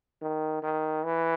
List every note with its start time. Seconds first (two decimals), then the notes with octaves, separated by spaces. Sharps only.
0.22 D#3
0.63 D#3
1.05 E3